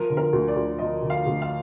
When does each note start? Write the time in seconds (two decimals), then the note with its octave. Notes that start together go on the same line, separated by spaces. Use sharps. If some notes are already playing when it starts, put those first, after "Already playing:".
Already playing: F3 A#4
0.10 D3
0.17 A#4
0.33 D2
0.48 D5
0.56 D2
0.79 F3 D#5
1.02 D3
1.10 F5
1.26 D2
1.42 F5